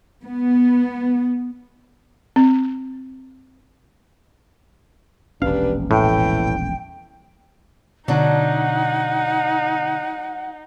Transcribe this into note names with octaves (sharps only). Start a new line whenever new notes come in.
B3
C4
E1 A#1 C#4 D4 G4 B4 F5
A2 E3 A3 G5
B2 D3 F#3 D4 D#4 F#5